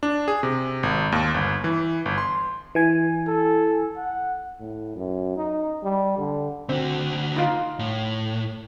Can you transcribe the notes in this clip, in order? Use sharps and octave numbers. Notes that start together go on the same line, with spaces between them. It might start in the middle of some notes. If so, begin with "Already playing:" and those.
D4
G#4
C3
G#1
D#2
G1
E3
G1
C6
E3 G#5
A4
F#5
A2
F#2
D#4
G3
D3
D3 C4 F#4
D#4 F4
A2